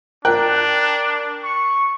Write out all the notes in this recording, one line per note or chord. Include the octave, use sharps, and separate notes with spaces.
D4 A#4 G5 F#6
C#6